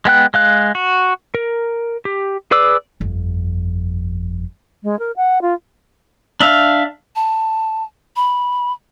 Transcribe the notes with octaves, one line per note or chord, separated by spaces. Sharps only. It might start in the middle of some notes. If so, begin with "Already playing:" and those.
G#3 B3 G5 F#6
G#3 F5 F#6
F#4
A#4
G4
G#4 B4 D5 D6 E6
G1 F2
G#3
A#4
F#5
F4
D4 E5 F5
A5
B5